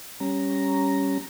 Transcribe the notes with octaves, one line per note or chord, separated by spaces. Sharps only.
G3 C#4 A#5